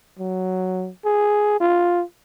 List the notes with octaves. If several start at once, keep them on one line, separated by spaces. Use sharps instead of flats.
F#3
G#4
F4